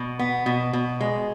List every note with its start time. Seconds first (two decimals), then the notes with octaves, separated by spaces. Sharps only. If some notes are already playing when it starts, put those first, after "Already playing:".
Already playing: B2
0.19 B3
0.46 B2
0.73 B2
1.01 G#3